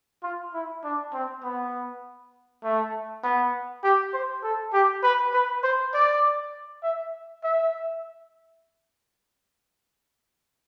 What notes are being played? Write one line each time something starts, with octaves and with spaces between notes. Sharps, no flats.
F4
E4
D4
C4
B3
A3
B3
G4
C5
A4
G4
B4
B4
C5
D5
E5
E5